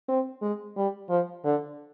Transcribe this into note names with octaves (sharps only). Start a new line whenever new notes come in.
C4
G#3
G3
F3
D3